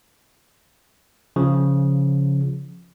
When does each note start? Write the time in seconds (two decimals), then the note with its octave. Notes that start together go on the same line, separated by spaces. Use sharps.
1.36 C#3 F3